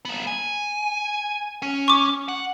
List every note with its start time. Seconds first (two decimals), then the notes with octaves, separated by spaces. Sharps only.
0.05 A#3 B3
0.27 G#5
1.62 C#4
1.88 C#6 D6
2.28 F#5